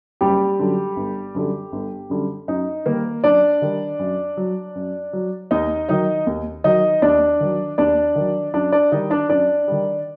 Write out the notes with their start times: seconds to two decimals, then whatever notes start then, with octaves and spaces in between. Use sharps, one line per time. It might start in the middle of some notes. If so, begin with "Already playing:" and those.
0.21 F#1 G3 G4
0.59 F#2 D3 F#3
0.96 G1
1.35 F#2 D3 G3
1.72 G1
2.10 F#2 D3 G3
2.48 F#2 D#4
2.86 D#3 G3 A#3 A#4
3.24 F#2 D4 D5
3.62 D#3 G3
3.99 F#2
4.37 F#3
4.75 F#2
5.13 F#3
5.51 D#2 D#4 D#5
5.89 D#3 F#3 D#4 D#5
6.27 D#2
6.64 D#3 F#3 D#4 D#5
7.02 D#2 D4 D5
7.40 D#3 F#3
7.78 D#2 D4 D5
8.15 D#3 F#3
8.54 F#2 D4 D5
8.72 D4 D5
8.92 D#3 G3 D#4 D#5
9.10 D4 D5
9.29 F#2 D4 D5
9.68 D#3 G3